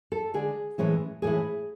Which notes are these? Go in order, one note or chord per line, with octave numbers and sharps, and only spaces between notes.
A4
D3 G#3 D4 G#4
A2 E3 G#3 C#4 E4
A2 E3 G#3 C#4 E4 G#4